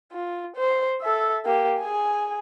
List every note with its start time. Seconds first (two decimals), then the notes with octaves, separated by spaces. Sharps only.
0.13 F4
0.56 C5
1.02 A4 E5
1.45 A#3 G4
1.80 G#4 G#5